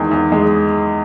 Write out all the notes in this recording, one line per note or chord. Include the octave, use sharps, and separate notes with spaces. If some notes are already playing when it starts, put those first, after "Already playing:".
Already playing: E2 D#3 G#3
E2
G#3